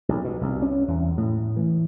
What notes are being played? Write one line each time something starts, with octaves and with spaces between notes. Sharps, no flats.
B1
B2
C2
C#4
E2
A2
E3